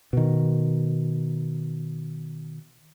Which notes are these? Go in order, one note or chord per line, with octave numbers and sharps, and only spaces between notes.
B2 D#3